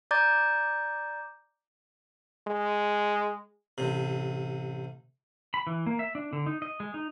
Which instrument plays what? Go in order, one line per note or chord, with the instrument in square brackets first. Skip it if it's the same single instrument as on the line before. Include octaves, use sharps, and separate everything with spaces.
[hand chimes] D5 A#5 D6 G6 A6
[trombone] G#3
[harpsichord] A1 C3
[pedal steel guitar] B5
E3
A#3
E5
D4
D3
D#4
D#5
G#3
D#4